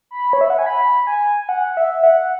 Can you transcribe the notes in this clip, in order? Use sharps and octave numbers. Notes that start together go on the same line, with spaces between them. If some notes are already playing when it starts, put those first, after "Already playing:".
B5
C#5
E5
F#5
G#5
B5
B5
G#5
G#5
F#5
E5
F#5